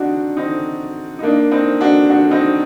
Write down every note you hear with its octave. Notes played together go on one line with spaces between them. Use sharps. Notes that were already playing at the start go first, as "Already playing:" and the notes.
Already playing: C4 D4 D#4 F#4
C4 D#4
D#4
A#3 D4
C4 D#4
D4 F#4
D4 F#4
C4 D#4